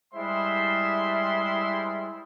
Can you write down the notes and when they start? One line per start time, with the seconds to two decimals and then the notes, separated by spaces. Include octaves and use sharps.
0.14 G3 G#3 E4 C5 E5 C6